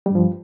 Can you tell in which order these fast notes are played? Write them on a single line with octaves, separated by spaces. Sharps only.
G3 G2 F3